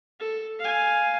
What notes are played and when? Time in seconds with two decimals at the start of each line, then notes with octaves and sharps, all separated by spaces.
0.20 A4
0.59 F5 G#5